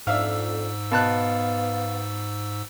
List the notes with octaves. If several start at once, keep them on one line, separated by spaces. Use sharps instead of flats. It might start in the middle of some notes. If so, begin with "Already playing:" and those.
F2 G#2 D4 E5 F5 E6
B2 B3 F5 A5 F#6